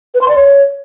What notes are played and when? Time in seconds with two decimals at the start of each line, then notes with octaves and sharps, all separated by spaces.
0.14 B4
0.21 C6
0.28 D5
0.35 C#5